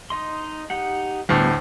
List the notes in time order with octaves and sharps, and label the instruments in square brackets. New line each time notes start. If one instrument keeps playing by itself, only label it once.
[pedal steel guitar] D#4 D#5 C6
D#4 G4 F#5
[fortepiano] D2 A2 [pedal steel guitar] G3 B3